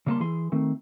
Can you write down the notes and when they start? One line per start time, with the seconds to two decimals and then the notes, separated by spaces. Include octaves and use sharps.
0.06 C#3 G3 A#3 B4 A5 C6
0.20 E3 G#4 C6
0.52 D#3 A3 C4